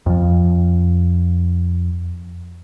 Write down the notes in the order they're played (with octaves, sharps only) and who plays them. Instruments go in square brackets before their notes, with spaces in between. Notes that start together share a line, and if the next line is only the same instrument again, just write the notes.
[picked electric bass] F2 F3